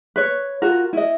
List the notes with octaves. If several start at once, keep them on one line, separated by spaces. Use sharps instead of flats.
B4 C#5
F4 F#4 A#4
E4 D#5